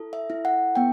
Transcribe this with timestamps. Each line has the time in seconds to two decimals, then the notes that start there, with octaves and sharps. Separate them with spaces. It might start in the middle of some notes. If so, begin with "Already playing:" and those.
Already playing: E4 A4
0.13 E5
0.30 E4
0.45 F#5
0.75 B3 G5